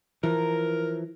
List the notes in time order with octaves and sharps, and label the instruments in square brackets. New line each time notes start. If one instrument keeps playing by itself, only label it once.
[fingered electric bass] E3 F3 [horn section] A#4